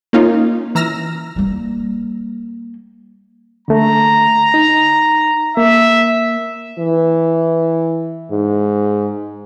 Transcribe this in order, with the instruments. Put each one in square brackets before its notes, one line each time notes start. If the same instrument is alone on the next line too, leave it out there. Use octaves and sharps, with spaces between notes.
[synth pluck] A#3 C#4 D#4 F4
E3 A#5 E6 F6 A#6
[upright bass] G3 A#3
[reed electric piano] D3 A3 [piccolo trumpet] A#5
[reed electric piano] D#4
[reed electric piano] A#3 [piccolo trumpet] E5
[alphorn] E3
G#2